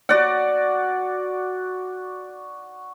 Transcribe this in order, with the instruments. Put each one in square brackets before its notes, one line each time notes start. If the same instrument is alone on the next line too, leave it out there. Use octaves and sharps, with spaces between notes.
[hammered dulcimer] F#4 D5 F#5